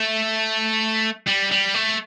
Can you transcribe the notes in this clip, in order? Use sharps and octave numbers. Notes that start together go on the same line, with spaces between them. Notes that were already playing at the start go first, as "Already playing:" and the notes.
Already playing: A3
G3
G3
A3